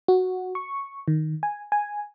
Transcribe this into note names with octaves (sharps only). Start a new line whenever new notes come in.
F#4
C#6
D#3
G#5
G#5